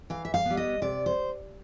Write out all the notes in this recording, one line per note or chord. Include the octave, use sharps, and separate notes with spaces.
E3 F5
E5
F5
G3 B3
D#5
C3 D5
C5